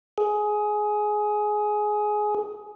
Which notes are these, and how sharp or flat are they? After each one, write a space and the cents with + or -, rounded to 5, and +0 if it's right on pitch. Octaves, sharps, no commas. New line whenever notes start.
G#4 +15